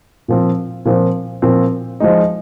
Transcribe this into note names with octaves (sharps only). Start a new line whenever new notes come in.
A#2 F3 C4
A#2 F3 C4
A#2 F3 C4
F3 G#3 D#4